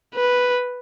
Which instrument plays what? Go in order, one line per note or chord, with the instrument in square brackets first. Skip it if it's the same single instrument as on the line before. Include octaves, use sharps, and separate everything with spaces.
[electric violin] B4